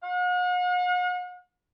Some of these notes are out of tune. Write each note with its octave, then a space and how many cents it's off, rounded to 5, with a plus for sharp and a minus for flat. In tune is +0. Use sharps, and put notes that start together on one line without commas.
F#5 -45